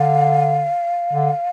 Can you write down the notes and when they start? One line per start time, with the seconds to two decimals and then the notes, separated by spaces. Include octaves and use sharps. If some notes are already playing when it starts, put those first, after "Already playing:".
Already playing: D3 F5
1.13 D3